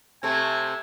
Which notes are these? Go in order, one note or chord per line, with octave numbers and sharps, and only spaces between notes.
C3 A3 C4 G#5